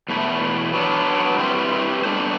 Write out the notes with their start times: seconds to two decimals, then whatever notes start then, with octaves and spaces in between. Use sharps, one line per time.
0.09 E2 B2 A3 E4
0.73 F#3 B3 D4
1.38 G3 C4 E4 G4 B4
2.03 G3 B3 D4 A4 C5